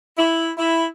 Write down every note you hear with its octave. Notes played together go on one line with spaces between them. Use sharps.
E4
E4